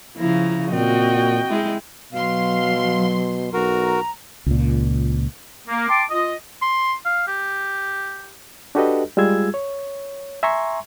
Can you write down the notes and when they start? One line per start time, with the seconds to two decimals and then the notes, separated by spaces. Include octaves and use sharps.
0.18 C#3 F3 E4 A#5
0.72 A#2 C4 F#4 D#5 G5
1.49 G#3 E4
2.13 B2 F#3 F5 C6
3.53 B1 F#4 A#4 A#5
4.46 C#2 A#2
5.67 A#3
5.89 G5 A5 C6 D6
6.10 F4 D#5
6.62 C6
7.05 F5
7.27 G4
8.75 D4 F#4 G4 A4 B4 D#5
9.17 G3 G#3 F4 G#4 E6 G#6
9.54 C#5
10.43 E5 G#5 A#5 C6 C#6